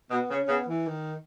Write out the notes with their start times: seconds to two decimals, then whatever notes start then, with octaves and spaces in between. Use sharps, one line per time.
0.11 B2 B3
0.30 C#3 C#4
0.44 C#4
0.49 C#3 B3
0.68 E3
0.87 D#3